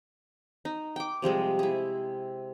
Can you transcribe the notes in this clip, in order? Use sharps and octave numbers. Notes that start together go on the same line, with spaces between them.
D#4
G5 D6
C3 F3 G3 G#3
E4 G#4